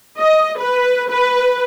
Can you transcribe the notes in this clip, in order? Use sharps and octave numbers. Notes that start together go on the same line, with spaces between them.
D#5
B4
B4